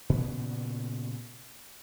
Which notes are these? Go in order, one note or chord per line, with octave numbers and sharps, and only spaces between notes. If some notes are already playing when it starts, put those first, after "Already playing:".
A#2 C#3 E3 B3